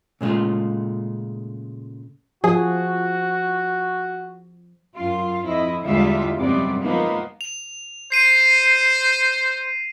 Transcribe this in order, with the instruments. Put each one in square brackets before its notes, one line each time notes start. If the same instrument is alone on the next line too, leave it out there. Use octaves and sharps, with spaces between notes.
[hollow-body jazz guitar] A#2 C#3 G#3 A3 F4
[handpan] F3 [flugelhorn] F#4 [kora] G#4
[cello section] F#2 F4
F2 E4 D#5
E2 D3 G3 G#3 F4 E5
F#2 C3 G3 G#3 B3 D5
F3 G#3 A#3 B3 D#4
[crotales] F7
[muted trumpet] C5 [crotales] C7 D#7